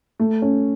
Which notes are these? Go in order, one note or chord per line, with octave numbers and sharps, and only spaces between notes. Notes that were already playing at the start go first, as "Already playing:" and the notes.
A3
C#4